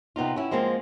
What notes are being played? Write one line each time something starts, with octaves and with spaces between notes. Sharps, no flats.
C3 B3 D#4 F4
C#4 E4
F3 G#3 A#3 C4